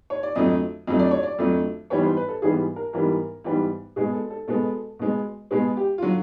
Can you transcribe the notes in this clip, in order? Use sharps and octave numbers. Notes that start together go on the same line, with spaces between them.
C#5
D5
F2 D3 F#3 A3 D#5
F2 D3 F#3 A3 D#5
D5
C#5
D5
F2 D3 F#3 A3
G#2 E3 G3 B3 C#5
C5
B4
A4
G#2 E3 G3 B3 G#4
A#4
G#2 E3 G3 B3 A#4
G#2 E3 G3 B3
B2 G#3 B3 G#4
A4
A4
B2 G#3 B3 A4
B2 G#3 B3
B2 G#3 B3 G#4
G4
F4
D3 F#3 F#4